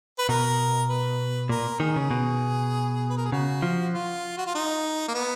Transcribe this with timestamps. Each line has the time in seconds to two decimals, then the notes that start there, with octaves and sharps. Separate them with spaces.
0.19 B4
0.29 B2 A#4
0.89 B4
1.49 A#2 A#4
1.80 D#3 G#4
1.96 C#3
2.11 B2
3.10 B4
3.17 A#4
3.25 G#4
3.32 C#3 F#4
3.62 F3
3.94 F4
4.38 F#4
4.47 F4
4.55 D#4
5.08 A#3
5.15 B3